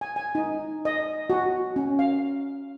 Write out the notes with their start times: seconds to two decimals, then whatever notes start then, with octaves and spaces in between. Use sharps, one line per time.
0.01 G#5
0.16 G#5
0.35 D#4
0.85 D#5
1.30 F#4
1.76 C#4
1.99 F5